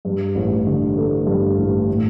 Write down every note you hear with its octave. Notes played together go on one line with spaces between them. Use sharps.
G2
A1
D3
A3
G2
A1
A2